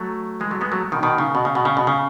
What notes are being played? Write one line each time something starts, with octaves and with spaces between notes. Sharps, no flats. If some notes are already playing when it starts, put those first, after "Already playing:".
Already playing: F#3 A3
E3 G#3
F#3 A3
G#3 B3
F#3 A3
B2 D#3
B2 D#3
C#3
B2
C#3
B2
C#3
B2
C#3